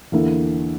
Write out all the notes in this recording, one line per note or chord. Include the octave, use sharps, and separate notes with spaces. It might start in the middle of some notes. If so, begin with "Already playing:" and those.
E2 D3 A#3 E4